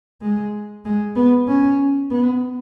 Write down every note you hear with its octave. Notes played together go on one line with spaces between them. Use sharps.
G#3
G#3
B3
C#4
B3